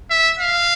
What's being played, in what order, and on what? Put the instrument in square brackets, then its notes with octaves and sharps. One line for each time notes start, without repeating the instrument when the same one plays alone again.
[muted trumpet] E5
F5